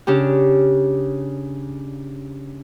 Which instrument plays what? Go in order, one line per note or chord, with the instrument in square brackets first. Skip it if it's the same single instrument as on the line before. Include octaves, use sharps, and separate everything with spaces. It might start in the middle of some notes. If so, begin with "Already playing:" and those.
[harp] C#3 D4 G4